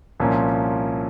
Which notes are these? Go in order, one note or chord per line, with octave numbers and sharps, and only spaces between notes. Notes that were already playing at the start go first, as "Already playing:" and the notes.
C2 A#2 F3 A#3 C#4